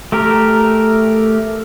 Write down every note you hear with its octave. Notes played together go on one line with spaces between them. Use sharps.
A3 G4 A#4